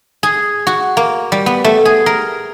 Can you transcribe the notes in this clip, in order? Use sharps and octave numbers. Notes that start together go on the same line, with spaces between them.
G#4
F#4
A#3
G3
B3
A3
G#4
A#4